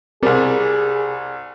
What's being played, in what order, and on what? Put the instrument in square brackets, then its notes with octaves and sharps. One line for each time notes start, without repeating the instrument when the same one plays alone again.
[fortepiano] C2 G3 [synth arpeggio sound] C4 A#4 [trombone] G#4